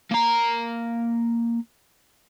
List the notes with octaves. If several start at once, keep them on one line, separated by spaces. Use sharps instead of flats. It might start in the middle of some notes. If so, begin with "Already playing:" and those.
A#3 A#5